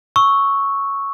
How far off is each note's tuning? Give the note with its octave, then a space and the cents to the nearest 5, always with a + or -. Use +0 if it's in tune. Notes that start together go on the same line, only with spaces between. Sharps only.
C#6 +0 E6 -10